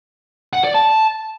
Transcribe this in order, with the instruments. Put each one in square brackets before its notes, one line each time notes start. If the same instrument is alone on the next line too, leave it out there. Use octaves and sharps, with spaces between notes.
[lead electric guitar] F#5
D5
A5